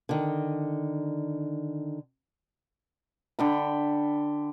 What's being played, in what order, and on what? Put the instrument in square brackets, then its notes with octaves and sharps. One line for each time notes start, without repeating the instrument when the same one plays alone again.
[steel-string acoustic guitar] D3 D#3
[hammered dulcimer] D3 G5 B5